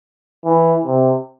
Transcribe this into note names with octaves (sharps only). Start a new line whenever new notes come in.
E3
C3